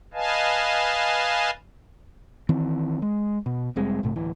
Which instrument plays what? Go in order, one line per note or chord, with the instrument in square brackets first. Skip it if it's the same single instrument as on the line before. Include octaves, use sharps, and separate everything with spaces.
[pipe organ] B4 D#5 F5 G#5 A5
[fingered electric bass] D#3 E3 C4
G#3
B2
F1 G3 G#3 C4
A#1 G#2 C3 A3
D1 E3